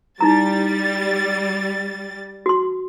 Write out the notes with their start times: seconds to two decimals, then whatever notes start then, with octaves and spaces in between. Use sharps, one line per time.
0.21 G3 D#4 E4 A#5 A6
2.46 F#4 C6